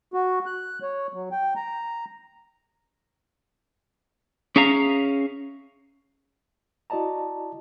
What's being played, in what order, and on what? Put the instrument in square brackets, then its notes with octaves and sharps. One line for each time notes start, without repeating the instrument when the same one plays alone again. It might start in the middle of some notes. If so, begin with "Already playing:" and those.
[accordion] F#4
F#6
C#5
F#3
G5
A#5
[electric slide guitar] C#4 G#4 E5 F5 A#5
[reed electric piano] E4 F#4 D5 D#5 A5 A#5